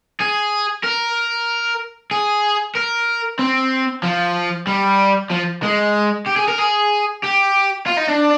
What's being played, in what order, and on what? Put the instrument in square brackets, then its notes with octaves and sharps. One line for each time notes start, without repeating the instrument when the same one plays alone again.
[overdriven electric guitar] G#4
A#4
G#4
A#4
C4
F3
G3
F3
G#3
G4
G#4
A#4
G#4
G4
F4
D#4
D4